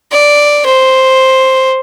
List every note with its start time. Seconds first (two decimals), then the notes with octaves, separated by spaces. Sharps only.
0.12 D5
0.66 C5